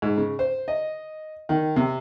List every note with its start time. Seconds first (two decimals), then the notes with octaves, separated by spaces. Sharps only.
0.02 G#2
0.17 C#3
0.39 C5
0.68 D#5
1.49 D#3
1.76 C3